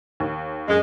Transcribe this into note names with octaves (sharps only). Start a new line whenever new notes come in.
D#2
F#2 G#3